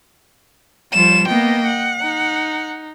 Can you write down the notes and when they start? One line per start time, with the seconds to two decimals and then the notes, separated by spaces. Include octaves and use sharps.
0.93 F3 G3 E7
1.28 A#3 B3 D#5 G5
1.67 F#5
2.02 D#4